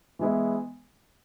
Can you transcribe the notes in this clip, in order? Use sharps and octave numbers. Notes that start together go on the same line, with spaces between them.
E3 G#3 B3 E4